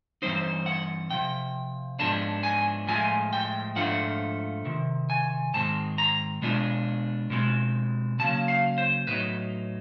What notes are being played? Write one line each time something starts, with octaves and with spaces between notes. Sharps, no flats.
G2 E3 G3 C4 D#4 C5
F#5
C3 F3 G5
G#2 F3 G#3 B3 D4 A5
G#5
A2 F3 G#3 G#5
G5
G#2 F3 A3 D4 F4 F#5
C3 D#3
G#5
G#2 D#3 G#3 C4 A5
A#5
B2 G#3 B3 D4 F4
B2 G#3 C4
C#3 F#3 A#3 A5
F5
C5
A2 F#3 B3 D#4 B4